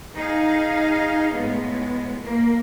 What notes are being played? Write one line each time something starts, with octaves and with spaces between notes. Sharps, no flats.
D#4 G#4 F5
A2 G#3 B3
A#3